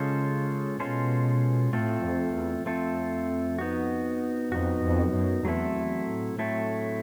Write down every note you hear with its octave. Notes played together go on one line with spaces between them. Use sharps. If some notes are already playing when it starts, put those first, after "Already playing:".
Already playing: C#3 G#3 C#4 F4 A4 C5
B2 G#3 C#4 F4 A4 C5
A2 A3 C4 F4 A4
F2
E2
F2 A3 C4 F4 A4
B3 D#4 F#4
F2 B3 D#4 F#4
F2
F#2
E2 F#3 A3 C4 E4 A4
E2
A2
A2 F#3 A3 C4 E4 A4